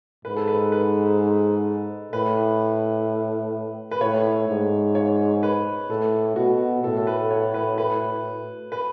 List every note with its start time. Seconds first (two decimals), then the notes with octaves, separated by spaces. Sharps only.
0.25 G#2 B4
0.37 A4
0.48 B4
0.72 B4
2.13 A2 B4
3.91 B4
4.01 A2 C#5
4.48 G#2
4.95 C#5
5.43 B4
5.90 A2 A4
6.36 B2 F#4
6.83 A2 A4
6.97 A4
7.07 B4
7.30 C#5
7.54 B4
7.78 B4
8.72 B4